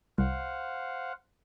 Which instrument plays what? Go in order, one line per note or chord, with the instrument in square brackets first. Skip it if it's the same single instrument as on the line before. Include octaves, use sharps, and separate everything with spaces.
[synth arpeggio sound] C2 [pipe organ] C5 F5 F#5